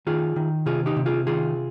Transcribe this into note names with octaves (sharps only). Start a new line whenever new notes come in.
D#3 F4 G#4
D#3
C3 F4 G#4
D#4 G4
C3
F4 G#4
D#3 F4 G#4